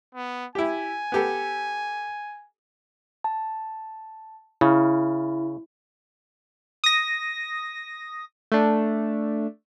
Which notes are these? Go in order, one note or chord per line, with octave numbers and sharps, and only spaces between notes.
B3
E4 G4 G#5
B3 G4 A4
A5
C#3 E4
D#6 A#6
A3 D4